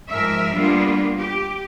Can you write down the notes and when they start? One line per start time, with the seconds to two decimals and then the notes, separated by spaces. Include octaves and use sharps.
0.10 G#2 F3 A#4 E5
0.55 G3 A#3 B3 D4 F4
1.18 G4